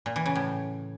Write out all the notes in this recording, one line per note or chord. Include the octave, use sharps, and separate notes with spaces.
A#2
E3
C#3
A2